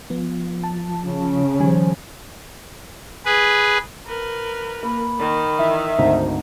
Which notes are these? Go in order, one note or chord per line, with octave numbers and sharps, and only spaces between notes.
F3 B3
A5
C#3
D#3 F3 G3 G#5
G#4 B4
A#4 B4
A#3 B5
D#3
E3 E5
G#1 D2 D#4 C5